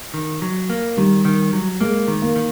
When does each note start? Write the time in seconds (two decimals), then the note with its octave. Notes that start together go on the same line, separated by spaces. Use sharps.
0.14 D#3
0.42 F#3
0.70 A#3
0.97 D#3 G3
1.25 D#3
1.53 F#3
1.81 G#3 A#3
2.08 D#3
2.22 A#3
2.36 D#3